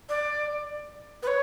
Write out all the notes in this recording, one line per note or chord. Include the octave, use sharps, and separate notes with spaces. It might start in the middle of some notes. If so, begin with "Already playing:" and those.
D5
B4
C#5